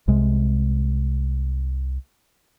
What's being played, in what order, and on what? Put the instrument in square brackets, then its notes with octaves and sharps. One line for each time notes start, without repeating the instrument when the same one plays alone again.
[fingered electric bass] C2 C3 G#3